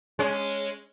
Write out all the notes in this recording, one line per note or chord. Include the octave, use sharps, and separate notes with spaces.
G#3 C#4